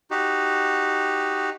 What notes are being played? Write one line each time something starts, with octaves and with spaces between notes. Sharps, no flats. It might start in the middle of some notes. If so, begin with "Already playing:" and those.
D#4 F#4 G4